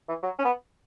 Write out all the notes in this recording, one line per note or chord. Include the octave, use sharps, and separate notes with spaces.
E3
F#3
C#4
B3